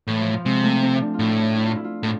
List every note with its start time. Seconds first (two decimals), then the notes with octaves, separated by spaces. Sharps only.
0.07 A2 E3
0.21 F3
0.33 F3
0.45 C3 G#3
0.64 A3
0.83 C4
1.01 D4
1.14 F4
1.19 A2 E4
1.38 F4
1.57 E4
1.66 F4
1.75 E4
1.84 F4
2.03 A2